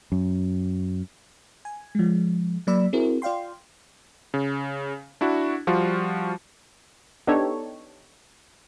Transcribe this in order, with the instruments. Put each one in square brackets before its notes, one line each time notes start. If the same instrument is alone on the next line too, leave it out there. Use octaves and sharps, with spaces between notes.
[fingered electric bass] F#2
[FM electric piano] G#5
F3 G#3
F#3 A#3 D5 B5 E6
C4 E4 F#4 G#4 A#4
F4 D5 F5 G5 C6
[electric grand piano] C#3
D4 E4 F#4
F3 G3 F4 F#4
[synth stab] B3 D4 D#4 G4 A4 C#5